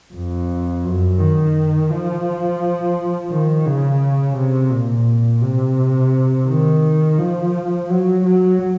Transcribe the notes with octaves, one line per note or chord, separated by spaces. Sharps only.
F2
F#2
D#3
F3
D#3
C#3
C3
A#2
C3
D#3
F3
F#3
F#3